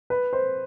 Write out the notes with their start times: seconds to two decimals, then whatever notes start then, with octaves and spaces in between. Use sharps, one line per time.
0.10 B4
0.33 C5